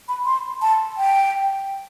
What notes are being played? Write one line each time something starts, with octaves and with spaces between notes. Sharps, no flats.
B5
C6
A5
G5